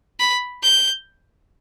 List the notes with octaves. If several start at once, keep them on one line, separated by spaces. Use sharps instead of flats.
B5
G6